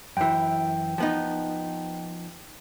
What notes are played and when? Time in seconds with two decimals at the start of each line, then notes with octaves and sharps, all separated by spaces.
0.17 F#2 E3 G5
0.98 F3 B3 D#4